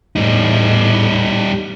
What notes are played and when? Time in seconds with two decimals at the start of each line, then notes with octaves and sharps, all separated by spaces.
0.16 E2 A2 G3 D#4